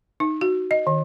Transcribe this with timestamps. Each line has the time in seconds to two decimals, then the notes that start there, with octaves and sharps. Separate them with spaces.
0.20 D#4
0.41 F#4
0.71 D#5
0.87 D#3